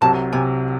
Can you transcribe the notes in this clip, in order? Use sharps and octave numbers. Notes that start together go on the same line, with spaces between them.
C2 C3 F#3 A5
C3 G#5